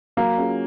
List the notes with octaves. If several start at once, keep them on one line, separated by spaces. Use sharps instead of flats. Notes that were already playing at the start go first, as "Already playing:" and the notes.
F#3 A#3
C#4 F4 G#4